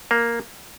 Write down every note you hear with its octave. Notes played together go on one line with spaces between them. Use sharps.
A#3